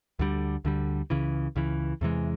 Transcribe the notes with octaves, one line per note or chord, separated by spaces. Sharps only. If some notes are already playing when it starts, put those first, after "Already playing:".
D2 D3 G3
D2 D3 G3
C#2 C#3 E3
C#2 C#3 E3
E2 C3 E3 G#3